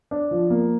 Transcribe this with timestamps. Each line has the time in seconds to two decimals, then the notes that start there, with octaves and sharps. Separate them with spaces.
0.11 D4
0.31 F3
0.50 A#3